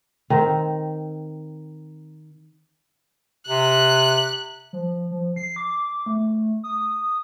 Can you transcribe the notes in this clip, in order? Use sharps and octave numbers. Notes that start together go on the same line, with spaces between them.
D#3 C4
C3 F#6
F3
F3
C7
D6
A3
D#6